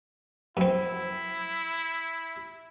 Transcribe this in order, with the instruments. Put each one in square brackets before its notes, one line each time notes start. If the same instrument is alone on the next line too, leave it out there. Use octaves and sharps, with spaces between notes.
[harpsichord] F#2 C4 [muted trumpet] E4